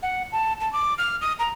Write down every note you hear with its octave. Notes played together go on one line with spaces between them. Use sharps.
F#5
A5
A5
D6
F6
D#6
A#5